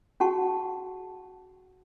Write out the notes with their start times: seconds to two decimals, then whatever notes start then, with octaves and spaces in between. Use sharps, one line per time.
0.20 C#4 F#4 G#4 F#5 A5 C#6